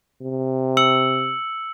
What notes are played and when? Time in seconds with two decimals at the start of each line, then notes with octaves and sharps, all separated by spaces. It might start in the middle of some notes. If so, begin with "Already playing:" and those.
0.22 C3
0.77 E6 C#7 F#7